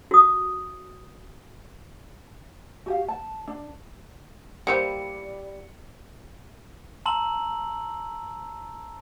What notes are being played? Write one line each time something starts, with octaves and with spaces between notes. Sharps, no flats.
F#4 D#6
F#4 G4 F5
A5
D4
G3 A#3 E4 G4 C5 D5 C#7
A5 A#5 C6 E6 F#7